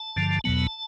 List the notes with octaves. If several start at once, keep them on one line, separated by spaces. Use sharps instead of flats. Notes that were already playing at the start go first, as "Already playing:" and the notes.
Already playing: A5
G2 D3 F3
E2 B2 F#3 B3 A5